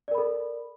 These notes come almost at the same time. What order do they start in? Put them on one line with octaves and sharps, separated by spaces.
D5 A#4 B5 A4